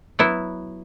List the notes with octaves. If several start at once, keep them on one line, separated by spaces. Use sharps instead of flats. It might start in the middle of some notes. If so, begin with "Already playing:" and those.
F#3 B3 E4